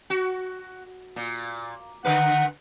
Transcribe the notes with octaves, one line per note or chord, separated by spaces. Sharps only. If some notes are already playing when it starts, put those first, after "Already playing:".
F#4
A#2
D3 A#4 B4 F#5